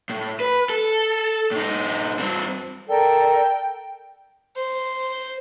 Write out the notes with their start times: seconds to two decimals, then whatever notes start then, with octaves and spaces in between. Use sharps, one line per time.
0.09 A2
0.40 B4
0.70 A4
1.51 A2 D#4
2.19 G2 C4
2.88 A4 A#4 D5 G5
4.57 C5